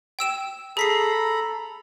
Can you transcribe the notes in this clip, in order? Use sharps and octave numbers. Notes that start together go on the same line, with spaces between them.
G5 E6 E7
G#4 A4 A#5 B5 B6 C7